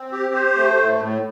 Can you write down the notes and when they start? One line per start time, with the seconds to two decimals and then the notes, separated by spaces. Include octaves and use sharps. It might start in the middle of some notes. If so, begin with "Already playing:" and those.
Already playing: C4
0.12 G4
0.34 C5
0.56 A3
0.78 A2
0.99 A2